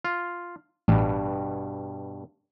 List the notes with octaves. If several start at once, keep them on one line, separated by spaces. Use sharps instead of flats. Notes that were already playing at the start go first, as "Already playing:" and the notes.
F4
A1 G2 B2